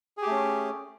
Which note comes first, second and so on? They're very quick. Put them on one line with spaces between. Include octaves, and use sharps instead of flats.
G#4 G4 A3 C#4